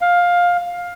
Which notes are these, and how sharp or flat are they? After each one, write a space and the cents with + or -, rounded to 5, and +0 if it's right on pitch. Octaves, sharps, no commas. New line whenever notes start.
F5 +15